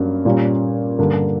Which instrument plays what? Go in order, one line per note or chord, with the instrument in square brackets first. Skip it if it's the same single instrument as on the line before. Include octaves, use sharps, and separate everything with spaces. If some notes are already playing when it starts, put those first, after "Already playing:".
Already playing: [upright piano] G2 F#3 A#3 C#4
A#2 G3 A#3 C#4
G2 D3 G3 A#3 D4